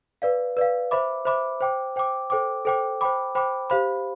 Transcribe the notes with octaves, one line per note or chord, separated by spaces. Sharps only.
B4 D5 F5
B4 D5 F5
C5 E5 B5 D6
C5 E5 B5 D6
C5 G5 D6
C5 G5 D6
A4 C5 G5 D6
A4 C5 G5 D6
C5 G5 B5 D6
C5 G5 B5 D6
G4 C5 F5 B5